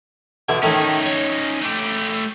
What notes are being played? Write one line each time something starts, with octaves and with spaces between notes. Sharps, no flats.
B2 D3 E4
A2 D#3 A3 C#4 D#4
C#5
A3 G4